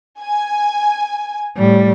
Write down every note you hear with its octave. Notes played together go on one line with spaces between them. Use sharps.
G#5
A2 G3